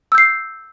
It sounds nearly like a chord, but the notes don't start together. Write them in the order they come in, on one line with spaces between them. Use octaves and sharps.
E6 G6 C7